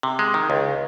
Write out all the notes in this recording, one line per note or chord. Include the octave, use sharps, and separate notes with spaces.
C3
G#3
D#3
C#2